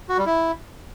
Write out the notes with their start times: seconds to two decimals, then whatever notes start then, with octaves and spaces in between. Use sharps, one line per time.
0.09 F#4
0.18 G3
0.26 E4